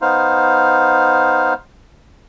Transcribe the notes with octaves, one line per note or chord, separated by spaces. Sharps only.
B3 D#4 C5 F5